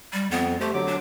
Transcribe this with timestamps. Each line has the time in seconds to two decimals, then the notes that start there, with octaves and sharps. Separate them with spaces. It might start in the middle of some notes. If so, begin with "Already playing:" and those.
0.13 G3
0.31 F2 B3
0.61 A3 G4 C5
0.74 D3 F#3 D6
0.87 D4